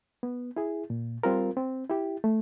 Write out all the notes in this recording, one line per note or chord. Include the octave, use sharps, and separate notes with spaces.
B3
E4 G#4
A#2
G3 C4 F4 A#4
C4
E4 G4
A3